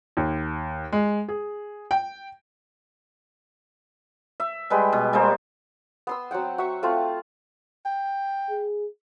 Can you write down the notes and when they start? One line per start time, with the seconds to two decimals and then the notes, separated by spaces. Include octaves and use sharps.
0.17 D#2
0.92 G#3
1.28 G#4
1.91 G5
4.40 E5
4.70 G3 G#3 B4 G5
4.93 B2
5.13 G3 G#3 A#3 C5
6.07 B3 C6 E6
6.31 F#3 C4 F#5 G5
6.58 F#4 E5 C#6
6.83 A3 C4 F4
7.85 G5
8.50 G#4